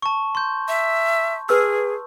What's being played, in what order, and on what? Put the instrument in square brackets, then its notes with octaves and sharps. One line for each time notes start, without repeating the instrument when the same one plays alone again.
[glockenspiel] A5 C#6
C6 G6
[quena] E5
[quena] G#4 [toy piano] B4 E6